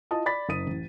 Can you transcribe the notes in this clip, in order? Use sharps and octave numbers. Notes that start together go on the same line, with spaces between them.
E4 F4 D#5 A5 D#6
D5 B5 A6 B6
F#1 D#6 D#7
A1